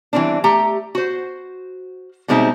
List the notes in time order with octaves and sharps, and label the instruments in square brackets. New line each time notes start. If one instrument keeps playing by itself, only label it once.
[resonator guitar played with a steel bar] E3 F#3 G3 C4 D4
A3 G4 A#5
F#4 C5
B2 G3 G#3 C4 D#4 E5